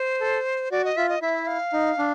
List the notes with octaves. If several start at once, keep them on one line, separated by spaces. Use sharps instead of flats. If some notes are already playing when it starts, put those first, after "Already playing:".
Already playing: C5
A4
F#4 D5
D#5
F4 E5
D#5
E4 E5
F5
D#4
D4